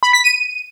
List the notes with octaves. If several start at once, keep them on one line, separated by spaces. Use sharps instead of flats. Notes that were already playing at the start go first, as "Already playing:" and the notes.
B5
B6
D#7